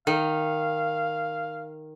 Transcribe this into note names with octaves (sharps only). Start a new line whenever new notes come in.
D#3 F5